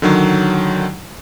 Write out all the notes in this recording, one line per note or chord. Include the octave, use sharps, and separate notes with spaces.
D3 D#3 F#3